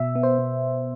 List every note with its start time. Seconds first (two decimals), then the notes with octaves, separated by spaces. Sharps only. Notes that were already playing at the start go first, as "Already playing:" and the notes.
Already playing: B2 E5
0.15 B3
0.23 C5
0.39 B2